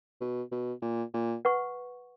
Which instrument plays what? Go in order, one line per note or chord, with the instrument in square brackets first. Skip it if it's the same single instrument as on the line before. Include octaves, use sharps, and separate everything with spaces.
[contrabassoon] B2
B2
A#2
A#2
[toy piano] B4 F#5 C#6